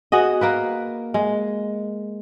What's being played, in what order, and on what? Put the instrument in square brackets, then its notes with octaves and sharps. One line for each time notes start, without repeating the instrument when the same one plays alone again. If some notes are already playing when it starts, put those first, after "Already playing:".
[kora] B3 F#4 G#4 D#5
A#3 A#4 B4
G#3